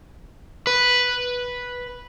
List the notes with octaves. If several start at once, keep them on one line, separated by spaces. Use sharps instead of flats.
B4